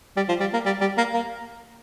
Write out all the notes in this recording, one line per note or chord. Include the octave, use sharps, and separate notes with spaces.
G3
F3
G3
A#3
G3
G3
A#3
A#3